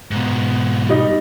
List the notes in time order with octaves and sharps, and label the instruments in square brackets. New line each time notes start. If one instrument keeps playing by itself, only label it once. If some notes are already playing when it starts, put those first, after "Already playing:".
[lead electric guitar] G#2 B2
[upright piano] G3 D#4